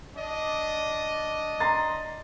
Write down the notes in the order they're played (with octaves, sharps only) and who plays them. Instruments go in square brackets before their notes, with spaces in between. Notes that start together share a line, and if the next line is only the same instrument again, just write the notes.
[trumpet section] D4 D5 D#5
[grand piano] A#5 C6 A6